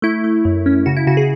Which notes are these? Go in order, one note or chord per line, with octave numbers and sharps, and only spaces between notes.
A3 E4
A3
F#2
C#4
C#3 F#4
E4
C#3 F#4
G#4